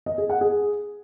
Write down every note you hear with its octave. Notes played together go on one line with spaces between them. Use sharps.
D#5
G#4
F#5
G#4